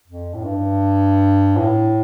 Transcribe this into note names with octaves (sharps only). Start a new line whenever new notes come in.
F2
A2
G2
A2